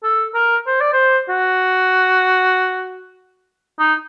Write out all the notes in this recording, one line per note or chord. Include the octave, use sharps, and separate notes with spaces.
A4
A#4
C5
D5
C5
F#4
D#4